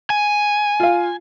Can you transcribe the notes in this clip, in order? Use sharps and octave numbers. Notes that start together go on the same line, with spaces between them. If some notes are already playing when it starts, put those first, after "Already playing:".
G#5
F4 F5